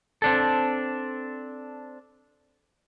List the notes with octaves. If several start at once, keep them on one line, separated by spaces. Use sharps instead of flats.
C4 D4 A4